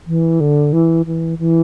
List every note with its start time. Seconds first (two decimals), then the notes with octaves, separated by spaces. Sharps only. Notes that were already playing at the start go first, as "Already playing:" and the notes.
0.07 E3
0.40 D3
0.73 E3
1.06 E3
1.39 E3